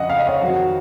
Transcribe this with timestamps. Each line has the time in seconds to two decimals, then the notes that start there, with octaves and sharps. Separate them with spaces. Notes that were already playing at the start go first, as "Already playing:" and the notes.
Already playing: F2 C#3 D#5 F#5
0.09 F5
0.18 D#5
0.27 C#5 F5
0.41 F2 D#3 F#4